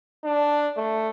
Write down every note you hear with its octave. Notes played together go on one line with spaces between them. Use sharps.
D4
A3